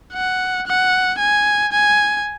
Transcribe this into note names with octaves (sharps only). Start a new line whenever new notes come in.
F#5
F#5
G#5
G#5